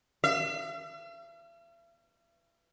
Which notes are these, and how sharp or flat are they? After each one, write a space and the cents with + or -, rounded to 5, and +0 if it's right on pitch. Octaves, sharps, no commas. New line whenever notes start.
E5 +45